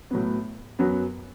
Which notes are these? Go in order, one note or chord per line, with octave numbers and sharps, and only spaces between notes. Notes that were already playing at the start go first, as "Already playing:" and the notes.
A2 F#3 B3
F#2 F#3 B3